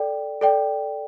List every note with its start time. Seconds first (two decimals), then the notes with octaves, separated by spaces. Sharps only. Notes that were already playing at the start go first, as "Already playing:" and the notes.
Already playing: A4 D5 G5
0.41 A4 D5 G5